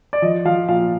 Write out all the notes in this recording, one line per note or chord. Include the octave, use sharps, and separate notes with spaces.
D5
F3 D#5
F3 F5
A#2 F5